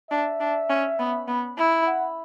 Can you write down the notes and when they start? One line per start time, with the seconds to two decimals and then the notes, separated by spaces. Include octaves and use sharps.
0.11 D4 E5
0.40 D4
0.69 C#4
0.99 B3
1.28 B3
1.58 E4
1.87 F#5